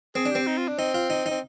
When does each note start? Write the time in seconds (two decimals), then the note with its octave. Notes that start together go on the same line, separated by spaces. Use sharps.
0.15 C4 G#4
0.26 D4
0.31 C4 G4
0.47 D#4
0.58 F4
0.68 D4
0.79 C4 D#4
0.94 F4
1.10 D#4
1.26 C4 D#4